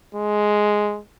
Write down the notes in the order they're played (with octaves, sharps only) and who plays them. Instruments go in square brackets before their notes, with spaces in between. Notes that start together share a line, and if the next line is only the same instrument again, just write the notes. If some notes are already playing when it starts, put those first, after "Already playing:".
[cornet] G#3